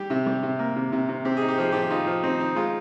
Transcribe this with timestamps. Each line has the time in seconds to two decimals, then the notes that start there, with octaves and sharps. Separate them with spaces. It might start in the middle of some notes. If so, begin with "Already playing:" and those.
Already playing: G3 G4
0.10 C3
0.26 G3
0.43 C3
0.59 A#3
0.76 C3
0.92 C3
1.09 C3
1.25 C4 G4
1.37 D#4 G#4
1.48 G4
1.58 F3 G#4
1.72 F3 G4
1.90 D#4 F4
2.07 F3
2.23 C4 D#4
2.40 D#4
2.56 G#3 F4